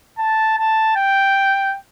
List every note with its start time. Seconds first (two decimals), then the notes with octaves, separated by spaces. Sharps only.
0.18 A5
0.58 A5
0.96 G5